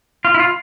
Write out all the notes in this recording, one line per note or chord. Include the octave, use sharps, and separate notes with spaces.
F4
E4
F4